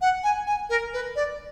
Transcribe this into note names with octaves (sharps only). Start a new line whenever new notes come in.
F#5
G#5
G#5
A#4
B4
D5